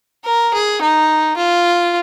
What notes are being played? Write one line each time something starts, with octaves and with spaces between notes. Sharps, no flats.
A#4
G#4
D#4
F4